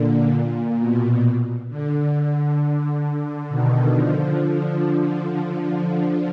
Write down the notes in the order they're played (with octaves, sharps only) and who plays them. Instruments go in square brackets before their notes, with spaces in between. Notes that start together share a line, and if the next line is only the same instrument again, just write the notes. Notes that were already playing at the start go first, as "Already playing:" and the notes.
Already playing: [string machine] A#2 D3
A#2
B2
D3
D3
B2 D#3
D3 F3
D3 F3
D3 F3
D3 F3